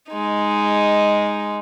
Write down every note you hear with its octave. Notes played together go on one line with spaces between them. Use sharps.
G#3 D#4